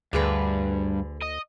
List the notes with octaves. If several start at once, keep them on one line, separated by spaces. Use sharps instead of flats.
D2 G2 D3 G#4 B4
D#5